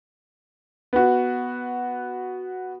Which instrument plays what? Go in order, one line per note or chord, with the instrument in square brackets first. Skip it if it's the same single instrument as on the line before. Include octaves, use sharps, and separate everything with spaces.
[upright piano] B3 F#4